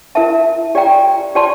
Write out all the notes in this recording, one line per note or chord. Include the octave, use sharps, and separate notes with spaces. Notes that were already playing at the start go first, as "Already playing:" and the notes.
E4 A#4 E5 A5
G4 D5 G5 A#5
G4 D5 A5 C6